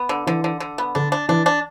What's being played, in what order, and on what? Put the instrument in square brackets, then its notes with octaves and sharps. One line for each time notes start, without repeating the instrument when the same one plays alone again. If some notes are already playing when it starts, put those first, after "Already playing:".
Already playing: [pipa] B3
D3
[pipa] D3 [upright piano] E3
[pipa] D3
D3
B3
[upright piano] D3 [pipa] D4
[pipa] D4
[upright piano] E3 [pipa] D4
[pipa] D4